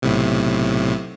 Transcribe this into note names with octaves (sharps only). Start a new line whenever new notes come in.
B1 A2 C3